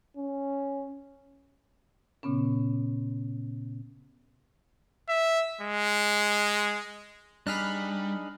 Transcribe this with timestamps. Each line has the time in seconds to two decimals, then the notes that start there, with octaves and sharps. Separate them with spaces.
0.17 C#4
2.23 A#2 C#3 B3 C#4
5.09 E5
5.61 G#3
7.47 G3 D4 D#4 G#4 B5 F6 F#6